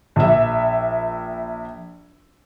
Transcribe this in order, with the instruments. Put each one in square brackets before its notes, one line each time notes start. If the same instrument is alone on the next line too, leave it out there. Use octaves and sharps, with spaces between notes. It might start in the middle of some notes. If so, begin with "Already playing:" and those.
[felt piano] A#1 E5